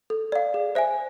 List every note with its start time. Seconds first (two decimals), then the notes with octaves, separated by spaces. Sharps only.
0.10 A4
0.32 D5 F5
0.54 G#4
0.75 C5 E5 G#5